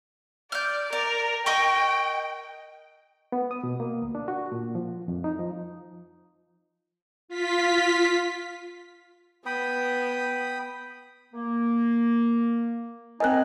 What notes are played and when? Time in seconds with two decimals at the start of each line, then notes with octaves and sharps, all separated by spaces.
0.52 D5 F6 G6
0.93 A#4 D5
1.46 A#4 D#5 G5 C#6
3.32 B3
3.51 D#6
3.64 B2
3.80 A#3
4.02 D2
4.15 D4
4.28 F#4
4.52 A#2
4.75 F3
5.08 F2
5.24 D#4
5.39 F3
7.28 F4 B6
9.46 B3 G5 B5 D#6
11.34 A#3
13.20 C4 D#4 A#4 D#5 G#5 F#6